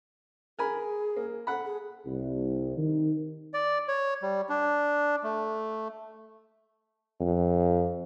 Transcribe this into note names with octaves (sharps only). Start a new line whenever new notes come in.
G#4 A#4 G#5 B5
A#3
A4 F#5 B5
G#4
C2
D#3
D5
C#5
G3
D4
A3
F2